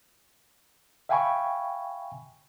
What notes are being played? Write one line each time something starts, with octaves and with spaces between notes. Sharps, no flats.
E5 F5 G5 G#5 B5 C#6